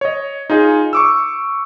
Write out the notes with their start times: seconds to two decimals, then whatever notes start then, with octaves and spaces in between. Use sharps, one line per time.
0.01 C#5 D#5
0.50 D#4 F4 G#4
0.93 C#6 D6 E6